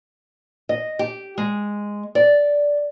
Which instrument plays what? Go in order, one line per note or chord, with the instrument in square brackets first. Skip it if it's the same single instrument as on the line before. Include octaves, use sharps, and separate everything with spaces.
[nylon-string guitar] D#5
G4
G#3
D5